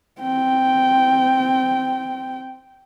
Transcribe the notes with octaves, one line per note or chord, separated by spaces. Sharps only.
C4 G5